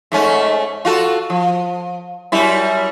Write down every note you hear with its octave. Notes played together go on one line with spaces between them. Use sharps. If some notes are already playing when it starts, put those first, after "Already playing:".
G#2 A3 C#4
F4 F#4 A4
F3
F#2 G3 E4